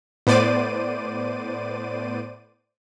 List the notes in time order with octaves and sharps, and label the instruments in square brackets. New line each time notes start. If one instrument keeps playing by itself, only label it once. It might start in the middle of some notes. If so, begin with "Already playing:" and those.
[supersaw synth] A2 B3 C5 D5 D6 D#7